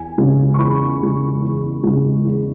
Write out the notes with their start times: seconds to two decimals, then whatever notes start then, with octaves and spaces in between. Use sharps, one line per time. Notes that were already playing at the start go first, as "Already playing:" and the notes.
Already playing: E2 G#5
0.18 C#3 G#3
0.54 C#6
0.59 E2 B5
1.01 C#3 G#3
1.42 E2
1.83 C#3 G#3
2.25 E2